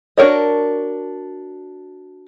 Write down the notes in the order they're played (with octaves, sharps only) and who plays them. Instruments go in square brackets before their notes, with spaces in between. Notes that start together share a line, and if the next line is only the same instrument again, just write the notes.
[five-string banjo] D4 F#4 A#4 C#5 D#5